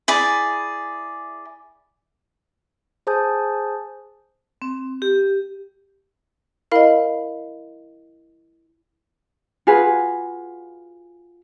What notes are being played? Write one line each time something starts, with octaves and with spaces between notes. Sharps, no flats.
E4 G#4 D5
G#4 C5 G#5 A5 D#6 G6
C4
G4
E4 A#4 D#5 F5 B5
F4 F#4 G#4 B4